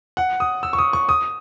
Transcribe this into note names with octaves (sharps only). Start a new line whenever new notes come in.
F#5
D#6
E6
C#6
D#6
C#6
D#6